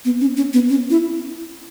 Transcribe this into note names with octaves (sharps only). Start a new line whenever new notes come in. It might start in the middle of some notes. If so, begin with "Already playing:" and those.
B3
C#4
C#4
B3
C#4
E4